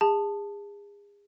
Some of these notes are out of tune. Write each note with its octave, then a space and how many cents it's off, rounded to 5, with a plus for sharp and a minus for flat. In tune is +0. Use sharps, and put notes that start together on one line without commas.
G#4 -35 A5 +0